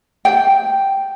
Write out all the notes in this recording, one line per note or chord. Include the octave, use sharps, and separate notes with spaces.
G5